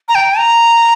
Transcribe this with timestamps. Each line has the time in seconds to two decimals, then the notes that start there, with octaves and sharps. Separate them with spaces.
0.09 A#5
0.15 G5
0.38 A#5